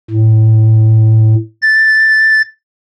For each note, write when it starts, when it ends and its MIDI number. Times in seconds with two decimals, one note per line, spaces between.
0.10 1.35 45
1.62 2.42 93